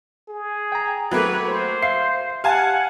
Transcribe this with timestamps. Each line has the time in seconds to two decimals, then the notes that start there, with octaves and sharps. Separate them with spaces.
0.29 G#4
0.72 G5 A#5
1.11 F#3 A3 A#3 B4
1.48 C5
1.82 E5 F5 C7
2.44 G4 F5 F#5 G#5 A5